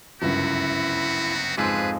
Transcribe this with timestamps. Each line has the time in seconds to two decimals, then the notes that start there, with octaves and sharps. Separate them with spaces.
0.22 G1 C#2 F#2 B3 C4 E4 F#4
1.57 F2 G#2 D4 G#4 B4 E6